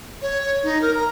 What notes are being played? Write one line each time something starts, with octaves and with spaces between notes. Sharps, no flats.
C#5
D#4
A#4
A#5